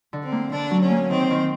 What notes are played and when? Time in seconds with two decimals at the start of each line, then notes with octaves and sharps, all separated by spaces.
0.13 D3
0.23 C4
0.32 A#3
0.51 D3 D4
0.71 F#3
0.81 C#4
0.91 A#3
1.10 D#3 C4
1.30 D#3